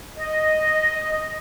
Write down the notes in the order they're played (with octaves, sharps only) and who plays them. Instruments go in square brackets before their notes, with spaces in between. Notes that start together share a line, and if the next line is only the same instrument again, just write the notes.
[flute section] D#5